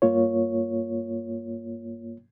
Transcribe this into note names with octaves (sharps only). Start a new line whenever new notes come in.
G2 A#3 F4 C#5